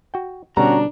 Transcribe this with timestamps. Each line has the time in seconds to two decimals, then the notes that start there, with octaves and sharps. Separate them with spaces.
0.14 F#4 G5
0.57 B2 D3 G3 C#4 D4 F#4 A#5